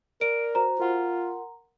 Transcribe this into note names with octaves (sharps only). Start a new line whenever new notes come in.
A#4 D5 D7
F#4 C5 A#5
F4 A#4 F#5 C6